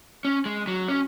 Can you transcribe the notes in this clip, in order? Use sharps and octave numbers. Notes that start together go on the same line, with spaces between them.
C#4
G#3
F#3
C#4